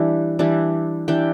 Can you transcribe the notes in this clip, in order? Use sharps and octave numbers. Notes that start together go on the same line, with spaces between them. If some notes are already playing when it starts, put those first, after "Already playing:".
Already playing: E3 G3 D4
E3 G3 D4
E3 G3 D4 G5